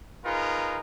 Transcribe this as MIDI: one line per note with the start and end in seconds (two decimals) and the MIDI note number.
0.25 0.80 63
0.25 0.80 65
0.25 0.80 68
0.25 0.80 70
0.25 0.80 71